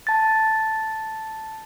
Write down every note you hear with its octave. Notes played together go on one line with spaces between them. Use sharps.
A5 A6